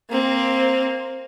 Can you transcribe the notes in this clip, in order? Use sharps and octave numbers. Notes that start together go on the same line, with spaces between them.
A#3 C4